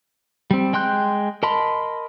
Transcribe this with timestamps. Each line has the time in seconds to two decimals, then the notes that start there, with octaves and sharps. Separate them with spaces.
0.51 G3 C4
0.73 G#3 G5 C6 F#6 G6
1.43 A#4 D#5 A5 B5 C6